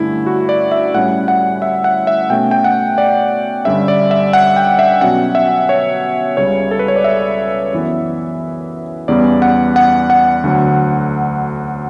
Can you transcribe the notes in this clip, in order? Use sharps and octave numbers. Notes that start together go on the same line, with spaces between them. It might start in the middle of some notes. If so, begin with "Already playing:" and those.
Already playing: G2 D3 A3 C#4 E4
F#4
D5
E5
A2 G3 C#4 F#5
F#5
E5
F#5
E5
B2 A3 C#4 G5
G5
F#5
D5
G2 D3 G3 C#4 E5
D5
E5
F#5
G5
E5
B2 F#3 C#4 F#5
E5
C#5
C#2 C#3 G3 C#4 C#5
A4
B4
C#5
D5
E5
F#2 E3 B3
E2 C#3 G3 B3 D5
F#5
F#5
F#5
D2 D3 F#3